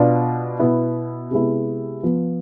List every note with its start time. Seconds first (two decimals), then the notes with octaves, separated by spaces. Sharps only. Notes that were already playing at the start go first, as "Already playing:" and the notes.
Already playing: B2 B3 D4 F4
0.59 B2 B3 E4
1.31 C3 G#3 B3 E4
2.03 F3 B3 F4